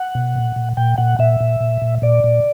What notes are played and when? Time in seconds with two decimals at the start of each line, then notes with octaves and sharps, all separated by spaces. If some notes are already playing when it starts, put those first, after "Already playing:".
Already playing: F#5
0.15 B2
0.35 A#2
0.56 A#2
0.77 A#2 G5
0.98 A#2 F#5
1.19 A#2 E5
1.40 A#2
1.60 A#2
1.82 A#2
2.02 A#2 D5
2.24 A#2